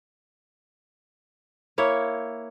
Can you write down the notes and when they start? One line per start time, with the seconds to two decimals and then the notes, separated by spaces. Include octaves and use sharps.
1.78 A#3 E4 C#5